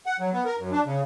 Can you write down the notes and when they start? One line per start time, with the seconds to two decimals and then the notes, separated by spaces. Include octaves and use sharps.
0.06 F#5
0.20 F#3
0.33 B3
0.45 A#4
0.59 F#2
0.72 D4
0.86 C#3